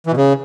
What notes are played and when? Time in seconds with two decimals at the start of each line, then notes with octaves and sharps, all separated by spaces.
0.07 E3
0.12 B2
0.17 C#3